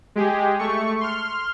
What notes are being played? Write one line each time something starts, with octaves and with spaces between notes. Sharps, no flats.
G#3 G4 G#4
A3 C#6
C6 F6